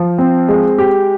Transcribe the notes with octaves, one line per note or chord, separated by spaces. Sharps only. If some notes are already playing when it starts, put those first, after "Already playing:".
Already playing: F3
C4
G#3
G4